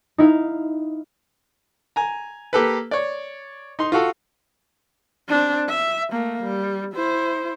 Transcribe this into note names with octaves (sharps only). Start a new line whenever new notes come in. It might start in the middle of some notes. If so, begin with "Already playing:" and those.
D#4 E4 F5
G#5 A#5
A#3 G4 A4 B4
C#5 D5
D#4 C6
F4 F#4 A4
C4 D4
E5
A3 A#3
G3
E4 C5